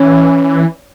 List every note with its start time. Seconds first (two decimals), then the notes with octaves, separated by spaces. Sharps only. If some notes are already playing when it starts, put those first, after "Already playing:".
Already playing: E3 C#4